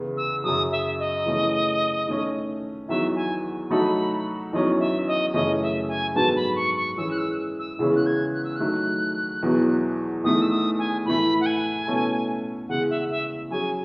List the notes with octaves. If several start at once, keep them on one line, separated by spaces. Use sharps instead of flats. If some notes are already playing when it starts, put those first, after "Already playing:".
Already playing: E2 C#3 E3 B3
E6
F#2 C#3 F#3 D#6
E5
D#5
C#3 E3 A3 C#4
D#3 A3 C#4
E2 D#3 F#3 E5
G#5
F#3 A3 D#4 F#4 A4 B5
E2 D#3 F#3 C#4 D#5
E5
D#5
F#2 C#3 E3 A3 C#4 D#5
E5
G#5
G#2 F#3 B3 F#4 A4 A5
B5
C#6
C#6
E3 G#3 C#4 G#4 E6
F#6
E6
E6
E2 C#3 E3 G#3 C#4
F#6
G#6
F#6
E6
D#3 F#3 A3 F#6
E2 B2 F#3
E2 D#3 A3 D#6
E6
D#6
G#5
A2 E3 A3 B5
F#5
G#5
B2 A3 C#4 E4 A4
E2 C#3 G#3 F#5
E5
E5
F#3 C#4 G#4 G#5